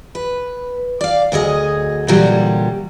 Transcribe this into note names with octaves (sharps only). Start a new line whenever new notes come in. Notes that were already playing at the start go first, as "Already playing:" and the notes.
B4
D5 F5
D2 F#3 G#4 D#5
A#2 D3 E3 F#3 G3 F#4